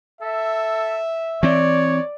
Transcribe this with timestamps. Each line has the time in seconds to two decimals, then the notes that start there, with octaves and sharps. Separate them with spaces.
0.22 A4 E5
1.43 E3 C4 C#5 D5